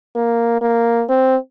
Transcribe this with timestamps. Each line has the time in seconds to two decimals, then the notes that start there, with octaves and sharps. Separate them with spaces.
0.16 A#3
0.61 A#3
1.09 C4